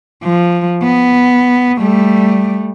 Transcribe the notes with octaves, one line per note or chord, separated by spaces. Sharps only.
F3
B3
G3 A3